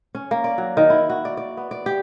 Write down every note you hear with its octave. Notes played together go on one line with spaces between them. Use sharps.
C#4
A#3
D5
F#3
D#3
E4
F#4
D5
D5
B3
D5
G4